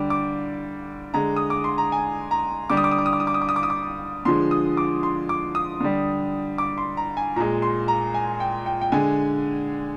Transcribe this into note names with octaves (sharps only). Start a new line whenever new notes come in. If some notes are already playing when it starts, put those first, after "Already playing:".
Already playing: D3 G3 D6
D6
D3 G#3 A#5
D#6
D6
C6
A#5
G#5
A#5
D3 G3 D6
D#6
D6
D#6
D6
D#6
D6
D#6
D6
D#6
D6
D#6
D6
D#6
D6
D3 F3 G#3 C6
D#6
D6
C6
D6
D#6
D3 G3
D6
C6
A#5
G#5
A#2 G#3 A#5
C6
A#5
G#5
G5
G5
G5
D3 G#3 G#5